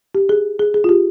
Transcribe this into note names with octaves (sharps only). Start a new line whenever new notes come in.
G4
G#4
G#4
G#4
F4
G4